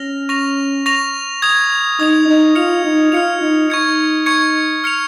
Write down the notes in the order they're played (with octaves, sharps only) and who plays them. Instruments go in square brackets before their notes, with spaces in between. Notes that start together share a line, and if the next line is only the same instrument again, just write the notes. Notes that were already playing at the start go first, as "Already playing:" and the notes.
Already playing: [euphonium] C#4 [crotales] F6 A#6 F7
[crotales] C#6 A#6 F7
C#6 A#6 F7
D#6 G#6 F7
[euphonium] D#4 [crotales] D#6 G#6 F7
[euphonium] D#4
[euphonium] F4 [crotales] F6 C#7 F7
[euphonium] D#4
[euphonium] F4 [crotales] F6 C#7 F7
[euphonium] D#4
[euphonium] D#4 [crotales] C#6 G#6 C#7
[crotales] C#6 G#6 C#7
F6 C#7 F7